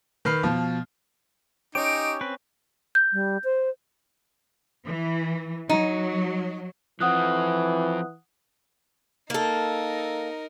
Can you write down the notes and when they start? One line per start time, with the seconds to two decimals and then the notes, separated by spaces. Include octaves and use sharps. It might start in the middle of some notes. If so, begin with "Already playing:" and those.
0.25 D#3 B4 F6 C7
0.43 B2 F3
1.75 C#4 D#4 G4 C#5 D7
2.21 C4 B4
2.95 G6
3.13 G3
3.44 C5
4.87 E3
5.70 F#3 D#4
7.00 E3 F3 C4 F#5 D#6 F#6
9.30 A#3 D#4 A4 A#4